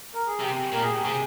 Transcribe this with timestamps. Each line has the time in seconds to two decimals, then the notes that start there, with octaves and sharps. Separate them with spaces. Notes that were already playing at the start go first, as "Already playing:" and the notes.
0.14 A#4
0.26 G#4
0.39 C3 G4
0.72 A#2 A#4
0.82 G#4
0.92 G4
1.02 C3 G#4